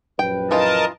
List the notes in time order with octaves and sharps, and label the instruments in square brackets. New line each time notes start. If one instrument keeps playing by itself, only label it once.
[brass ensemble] A#1 F#2 B4 [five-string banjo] G5
[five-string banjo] E3 D#4 F4 [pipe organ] A#4 D#5 A5